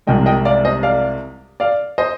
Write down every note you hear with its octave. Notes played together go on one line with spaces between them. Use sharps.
C2 C3 F3 G#3 D#5 G5
D#5 G5
D5 F5
C5 D#5
D5 F5
D5 F5
C5 D#5